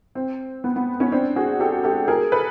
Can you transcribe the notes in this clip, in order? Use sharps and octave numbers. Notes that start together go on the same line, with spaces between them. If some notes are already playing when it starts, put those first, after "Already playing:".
C4
B3
B3
B3 C#4
C4 D4
F#4 G#4
G4 A4
G4 A4
G#4 A#4
A4 B4